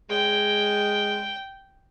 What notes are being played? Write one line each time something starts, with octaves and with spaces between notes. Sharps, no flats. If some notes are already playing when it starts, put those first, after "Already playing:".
G#3 G5